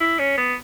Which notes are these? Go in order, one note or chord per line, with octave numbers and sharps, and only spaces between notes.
E4
C#4
B3